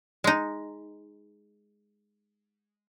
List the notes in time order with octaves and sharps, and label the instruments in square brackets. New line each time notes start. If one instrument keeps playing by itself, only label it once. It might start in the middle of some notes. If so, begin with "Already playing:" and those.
[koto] G#3 D#4